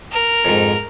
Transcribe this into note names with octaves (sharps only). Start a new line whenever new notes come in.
A#4
F2 G#2